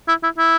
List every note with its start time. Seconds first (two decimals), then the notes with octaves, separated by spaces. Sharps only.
0.08 E4
0.23 E4
0.38 E4